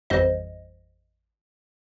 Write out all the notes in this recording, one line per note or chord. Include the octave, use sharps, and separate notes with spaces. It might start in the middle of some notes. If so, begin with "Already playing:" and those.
A1 F2 G3 C5 D#5